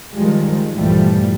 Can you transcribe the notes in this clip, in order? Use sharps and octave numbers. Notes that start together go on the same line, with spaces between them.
D#3 F3 G3 G#3
A#1 G2 E3 F3 G3 A3